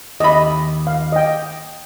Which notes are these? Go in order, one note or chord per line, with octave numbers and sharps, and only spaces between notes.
D#2 D#5 E5 B5
F5
D#5 G5